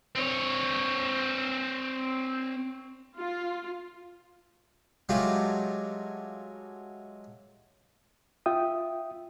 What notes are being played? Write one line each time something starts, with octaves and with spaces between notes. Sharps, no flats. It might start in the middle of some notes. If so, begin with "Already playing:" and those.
C4 C#5
F4
F#3 G#3 A3 F4 G4
F4 E5 G5 D#6